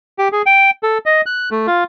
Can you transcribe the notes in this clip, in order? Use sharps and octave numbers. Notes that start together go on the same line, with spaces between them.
G4
G#4
G5
A4
D#5
F#6
A3
F4